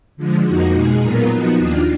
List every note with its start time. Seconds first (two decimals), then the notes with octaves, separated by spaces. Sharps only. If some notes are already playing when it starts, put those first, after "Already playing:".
0.17 D3 F3 G#3
0.45 F2 F3 A#3 D#4 F#4
0.73 B2 G#3 D#4 G#4
1.01 A#2 F#3 B3 F4 A#4
1.29 F3 B3 D#4 F#4
1.57 D#2 D#3 A#3 D4 F4